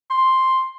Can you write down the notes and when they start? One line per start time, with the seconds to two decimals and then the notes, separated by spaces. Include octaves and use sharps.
0.11 C6